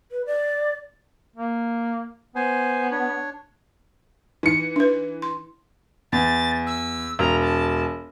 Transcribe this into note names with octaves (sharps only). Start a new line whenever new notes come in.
B4
D5
A#3
B3 C5 G#5
D4 C#5
E3 D#4 C#7
D4 B4
C6
E2 A6
E6
E1 A#5
A5